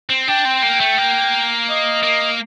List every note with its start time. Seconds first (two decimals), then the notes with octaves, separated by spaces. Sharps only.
0.10 C4
0.28 D4 G5
0.45 C4
0.63 A#3
0.80 A3
0.98 A#3
1.69 D#5
2.03 A#3